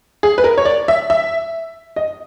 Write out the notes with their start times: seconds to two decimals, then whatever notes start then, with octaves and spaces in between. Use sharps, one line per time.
0.23 G#4
0.38 B4
0.44 A#4
0.58 C#5
0.65 D5
0.88 E5
1.10 E5
1.96 D#5